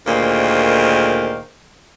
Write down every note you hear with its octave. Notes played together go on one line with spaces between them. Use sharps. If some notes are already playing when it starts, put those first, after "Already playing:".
D2 A#2 D#3 A#3 G#4 C5